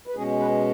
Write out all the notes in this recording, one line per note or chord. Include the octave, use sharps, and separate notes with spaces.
B4
B2 G#3 C#4 G#4
B4